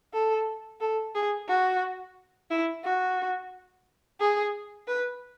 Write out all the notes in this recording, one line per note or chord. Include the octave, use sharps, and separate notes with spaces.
A4
A4
G#4
F#4
E4
F#4
G#4
B4